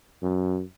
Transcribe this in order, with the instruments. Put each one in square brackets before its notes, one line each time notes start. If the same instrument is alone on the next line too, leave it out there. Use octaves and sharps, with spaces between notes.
[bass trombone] F#2